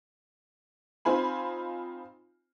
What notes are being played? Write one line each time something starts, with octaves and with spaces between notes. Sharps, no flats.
C4 D#4 F4 C5 G#5 B5